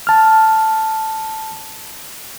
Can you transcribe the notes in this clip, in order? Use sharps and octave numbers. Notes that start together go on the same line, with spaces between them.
A5 F6